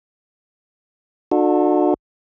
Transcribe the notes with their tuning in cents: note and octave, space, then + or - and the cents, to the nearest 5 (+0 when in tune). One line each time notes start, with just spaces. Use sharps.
D4 +35 F#4 -35 A4 +0